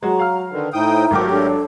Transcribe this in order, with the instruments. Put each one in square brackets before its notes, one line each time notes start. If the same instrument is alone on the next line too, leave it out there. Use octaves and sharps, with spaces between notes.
[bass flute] F#3 [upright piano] G#3 F#4 [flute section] A#5
[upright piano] F5 F6
[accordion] D3 D#3 [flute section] B4
[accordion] A2 G5 D#6 [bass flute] D#4 [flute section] E4 C5 E5
[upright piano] G#1 F#3 D6 [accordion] A3 G4 A#4
[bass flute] D4 [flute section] A4 C#5 A5